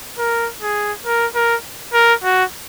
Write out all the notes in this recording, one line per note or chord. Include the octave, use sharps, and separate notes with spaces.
A#4
G#4
A#4
A#4
A#4
F#4